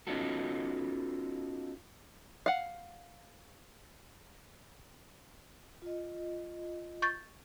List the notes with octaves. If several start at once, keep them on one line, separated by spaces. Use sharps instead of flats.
B3 C#4 D#4 F4 F#4 A4
F5 F#5
F4 D#5
C#6 G6 A6